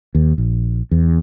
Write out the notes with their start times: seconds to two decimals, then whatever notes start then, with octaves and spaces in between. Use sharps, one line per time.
0.15 D#2
0.38 A#1
0.91 E2